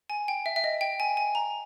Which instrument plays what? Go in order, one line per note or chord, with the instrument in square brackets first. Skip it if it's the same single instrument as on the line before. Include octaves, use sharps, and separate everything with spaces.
[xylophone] G#5
G5
E5
E5
D#5
G5
G#5
G#5
A#5